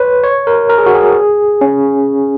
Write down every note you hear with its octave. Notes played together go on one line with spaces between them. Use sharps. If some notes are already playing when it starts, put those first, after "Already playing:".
Already playing: B4 C#5
C#5
A#4
A#4
G#4
F#4
G#4
C#4